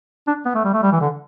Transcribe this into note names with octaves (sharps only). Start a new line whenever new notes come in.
D4
B3
A3
G3
A3
G3
E3
D3